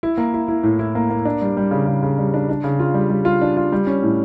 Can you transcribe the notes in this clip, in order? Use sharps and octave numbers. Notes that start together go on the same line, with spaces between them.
E4
A#3
E4
E4
A2
E4
A#3
A#3
D4
G3
G3
C#3
C#3
C#3
G3
D4
D4
C#3
F4
G3
G3
F4
D4
F4
G3
C#4
A2